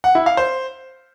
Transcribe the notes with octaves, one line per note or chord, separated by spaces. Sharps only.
F#5
E4
F5
C5